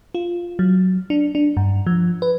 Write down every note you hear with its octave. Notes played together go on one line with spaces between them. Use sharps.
F4
F#3
D4
D4
G2
F3
B4